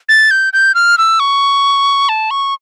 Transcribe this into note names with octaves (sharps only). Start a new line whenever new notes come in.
A6
G6
G6
F6
E6
C#6
A5
C#6